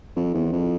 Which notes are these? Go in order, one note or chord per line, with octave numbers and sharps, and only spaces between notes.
F2
E2
F2